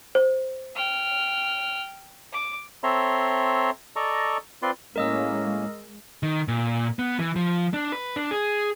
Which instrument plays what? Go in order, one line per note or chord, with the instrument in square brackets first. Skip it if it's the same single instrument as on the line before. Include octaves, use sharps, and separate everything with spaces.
[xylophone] C5
[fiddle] G5 F6
D6
[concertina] C4 A4 C#5 E5 A#5 C6
A4 D5 D#5 A#5 C#6
C4 F4 B4 D5 C6
[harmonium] A2 A#3 C#4 [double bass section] G#3 [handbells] A#4 D#5 E6
[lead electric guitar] D#3
A#2
B3
E3
F3
D4
B4
D4
G#4